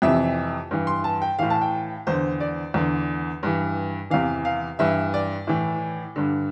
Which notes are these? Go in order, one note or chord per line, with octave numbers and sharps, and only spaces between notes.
F2 C3 E3 E5
G2 E3
C6
A5
G5
A2 E3 F5
A5
G5
E2 D3 C5
D5
E2 D3
G2 E3
E2 C3 E3 F5
F5
G2 E3 E5
D5
A2 E3
G2 D3